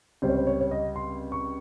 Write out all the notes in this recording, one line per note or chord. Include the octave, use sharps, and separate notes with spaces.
C#2 C3 G3 C5
C#5
C5
C#5
C#5
D#5
C6
C#6